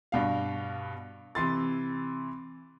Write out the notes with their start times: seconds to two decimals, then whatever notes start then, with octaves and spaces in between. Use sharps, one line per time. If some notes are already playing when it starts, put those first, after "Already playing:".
0.12 G2 B2 F5
1.35 C3 E3 C6 A6